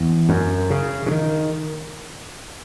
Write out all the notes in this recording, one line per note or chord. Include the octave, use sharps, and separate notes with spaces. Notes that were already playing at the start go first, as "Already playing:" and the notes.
Already playing: E2
F#2
C#3
C#3
D#3